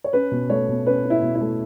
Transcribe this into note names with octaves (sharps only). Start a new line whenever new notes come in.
C#5
C#4 B4
B2
A3 C#5
B2
C#4 B4
C#4
E4
B2
E4
A3